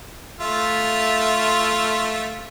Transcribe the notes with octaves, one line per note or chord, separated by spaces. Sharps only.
A3 F4 E5